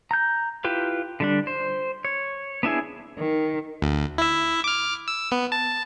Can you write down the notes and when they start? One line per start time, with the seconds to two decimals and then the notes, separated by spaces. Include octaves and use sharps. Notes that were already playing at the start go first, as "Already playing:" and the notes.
0.11 A#5 G6
0.64 E4 F4 G4 B4
1.20 D3 G3 D4
1.47 C5
2.05 C#5
2.63 B3 D4 E4 G#4
3.18 D#3
3.82 D2
4.18 E4 E5
4.64 D6 F6
5.08 E6
5.32 B3
5.52 A5